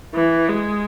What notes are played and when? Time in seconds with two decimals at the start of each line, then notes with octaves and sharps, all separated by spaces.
0.15 E3
0.48 G#3